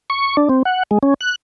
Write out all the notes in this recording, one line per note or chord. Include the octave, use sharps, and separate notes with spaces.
C#6
D4
C4
F#5
G#3
C#4
F#6